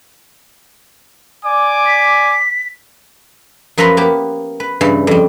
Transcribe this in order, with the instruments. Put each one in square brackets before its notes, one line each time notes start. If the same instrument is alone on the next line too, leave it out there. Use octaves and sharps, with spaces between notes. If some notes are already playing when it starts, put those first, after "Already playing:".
[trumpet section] D5 G#5 D6
[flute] B6
[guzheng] F#2 F3 B4 E5 A#5 C6
A#3 B3 G4 A5
B4
G2 C#3 E3
F2 G3